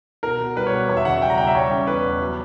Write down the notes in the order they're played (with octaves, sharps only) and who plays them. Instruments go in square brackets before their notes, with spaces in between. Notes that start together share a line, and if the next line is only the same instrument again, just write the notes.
[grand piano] B2 A#4
B2
G3 B4
C#5
B2 B4
E2 C#5
E5
C#3 F#5
E5
G3 G5
A#5
E2 G5
E5
G3 C#5
C#4
E2 B4
E2
F#3